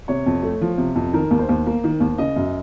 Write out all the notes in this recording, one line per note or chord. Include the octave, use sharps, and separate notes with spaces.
C3 C#5
F2
A3
F3
C3
F2
D#3 A#4
D#2
C5
D#2
A#3
D#3
D#2
C#3 D#5
F#2